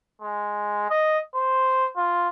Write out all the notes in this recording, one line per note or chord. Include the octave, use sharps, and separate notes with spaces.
G#3
D#5
C5
F4